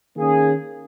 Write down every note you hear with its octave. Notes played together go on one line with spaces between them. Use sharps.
D#3 A#3 C#4 G#4